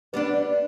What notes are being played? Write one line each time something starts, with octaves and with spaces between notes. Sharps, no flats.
G3 B3 D4 B4
D5